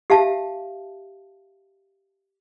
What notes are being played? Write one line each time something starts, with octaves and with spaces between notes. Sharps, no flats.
G4 E5 F5 A5